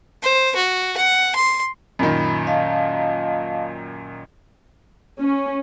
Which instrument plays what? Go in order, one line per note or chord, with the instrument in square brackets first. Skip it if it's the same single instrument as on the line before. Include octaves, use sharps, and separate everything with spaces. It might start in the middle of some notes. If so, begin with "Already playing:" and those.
[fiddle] C5
F#4
F#5
C6
[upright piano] F#2 A#2 D#3 [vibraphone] B5
[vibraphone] D#5 F5 A5
[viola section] C#4